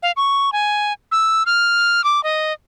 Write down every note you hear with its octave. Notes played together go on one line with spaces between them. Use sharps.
F5
C#6
G#5
E6
F6
D6
D#5